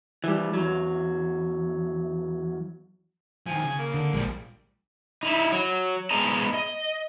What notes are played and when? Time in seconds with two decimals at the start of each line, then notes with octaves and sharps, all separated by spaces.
0.24 E3 G3
0.53 E2 F#3
3.47 D#3 F3 G#5
3.64 C#3
3.78 A#3
3.94 D3
4.13 A#1 G3 G#3
5.23 D#4 E4
5.52 F#3
6.11 G#3 B3 G#4 D#5 A#5
6.54 D#5